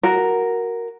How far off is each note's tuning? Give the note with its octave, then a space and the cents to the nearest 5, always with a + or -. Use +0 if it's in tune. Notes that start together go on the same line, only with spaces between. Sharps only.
F#4 +0 A#4 +0